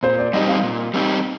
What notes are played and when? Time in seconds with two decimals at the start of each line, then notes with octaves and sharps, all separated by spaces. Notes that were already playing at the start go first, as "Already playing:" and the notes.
0.03 A#2 C5
0.18 D5
0.33 G3 C4 D#4 G4 D#5
0.48 F5
0.63 A#2
0.94 G3 C4 D#4 G4